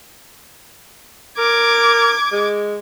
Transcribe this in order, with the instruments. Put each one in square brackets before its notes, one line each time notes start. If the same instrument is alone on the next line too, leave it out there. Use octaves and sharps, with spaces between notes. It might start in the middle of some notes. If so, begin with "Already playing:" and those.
[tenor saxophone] A#4 [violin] D6 G#6
[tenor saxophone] G#3